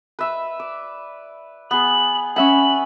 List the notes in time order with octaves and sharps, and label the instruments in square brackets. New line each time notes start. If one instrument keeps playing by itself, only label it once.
[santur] B4 E5 E6
D5
[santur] B3 G#4 [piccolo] F#7
[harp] C#4 E5 F#5 [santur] G#5 B5 [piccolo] F#7